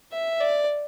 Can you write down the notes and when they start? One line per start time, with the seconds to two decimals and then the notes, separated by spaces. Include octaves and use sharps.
0.12 E5
0.40 D5